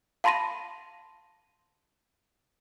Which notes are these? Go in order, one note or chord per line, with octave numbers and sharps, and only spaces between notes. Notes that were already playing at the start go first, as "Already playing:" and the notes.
F5 A5 B5 C6 A#6 D#7